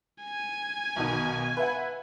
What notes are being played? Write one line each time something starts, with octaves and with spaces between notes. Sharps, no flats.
G#5
B1 B2 D#3
B4 E5 F#5